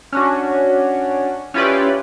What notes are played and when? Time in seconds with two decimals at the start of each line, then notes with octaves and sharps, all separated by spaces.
0.13 C#4 D4 F#4
1.54 C#4 E4 F4 G4 B4 D5